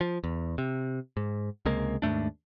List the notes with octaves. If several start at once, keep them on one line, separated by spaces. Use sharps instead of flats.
F3
E2
C3
G#2
C#2 C3 G#3 A#3
D#2 G#2 A3 D4